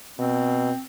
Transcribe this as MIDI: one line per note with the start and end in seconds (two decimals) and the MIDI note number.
0.19 0.71 47
0.19 0.84 60